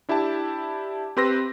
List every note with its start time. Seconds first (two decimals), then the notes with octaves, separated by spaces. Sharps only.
0.09 D4 E4 G4 E5 A5
1.17 C4 G4 B4 C6 E6 A#6